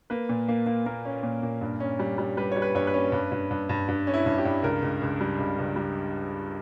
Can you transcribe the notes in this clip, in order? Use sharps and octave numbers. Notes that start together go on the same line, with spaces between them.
A#3 B4
A#2
A#3
A#3
A#3 A#4
C#4
A#2
A#2
G2
C#4
G3
G3
G3 B4
G3 C#5
B4
G2 C#5
B4
C#4
G2
G2
G2
G2
G2
C#4
E4
G2
G4
G2
C#2 A#4
C#2
C#2
G3
C#2
C#2
G3